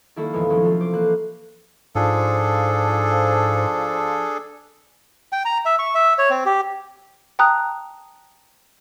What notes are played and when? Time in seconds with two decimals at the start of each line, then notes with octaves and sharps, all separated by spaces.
0.16 D#3 G3 A#3 E4 F#4 A4
0.33 E2 A#2 D#3 F3 G#3 B3
0.49 C3 D#3 F#3 G#3 C4 C#4
0.62 F4 A4
0.81 C5 D6
0.92 E3 A#3 F#6
1.95 G#2 F3 D4 G#4 A4
5.33 G5
5.45 A#5
5.66 E5
5.79 C#6
5.95 E5
6.19 C#5
6.30 C4
6.45 G4
7.39 G5 A5 A#5 D#6 F#6